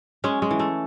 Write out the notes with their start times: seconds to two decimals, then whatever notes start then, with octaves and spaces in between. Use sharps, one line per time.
0.24 G#3 C#4
0.42 G#3
0.51 E3
0.59 A3